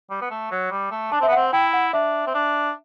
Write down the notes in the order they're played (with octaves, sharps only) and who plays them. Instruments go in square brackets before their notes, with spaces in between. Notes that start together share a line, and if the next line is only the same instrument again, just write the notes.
[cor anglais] G3
B3
A3
F#3
G3
A3
[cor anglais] D4 [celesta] A5
[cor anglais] C4 [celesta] E5
[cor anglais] B3
[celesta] F#5
[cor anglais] C4
[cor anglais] E4 [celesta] G5
[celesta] F#5
[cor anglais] D4 [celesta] E5
[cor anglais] C4
D4